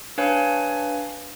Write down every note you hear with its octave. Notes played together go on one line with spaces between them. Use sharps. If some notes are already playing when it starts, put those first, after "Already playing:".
D4 B4 C#5 F5 G#5